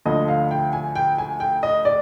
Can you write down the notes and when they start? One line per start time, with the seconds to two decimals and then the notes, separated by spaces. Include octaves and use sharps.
0.05 D2 D3 F3 D#5
0.28 F5
0.51 G5
0.73 G#5
0.95 G5
1.18 G#5
1.40 G5
1.63 D#5
1.85 D5